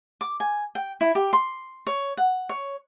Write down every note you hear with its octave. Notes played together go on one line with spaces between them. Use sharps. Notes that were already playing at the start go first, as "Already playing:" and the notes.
D6
G#5
G5
E4
G4
C6
C#5
F#5
C#5